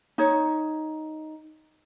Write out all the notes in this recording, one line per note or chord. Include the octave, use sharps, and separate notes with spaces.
D#4 C#5